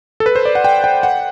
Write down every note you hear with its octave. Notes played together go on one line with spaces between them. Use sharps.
A4
B4
C5
D5
F#5
G5
G5
F#5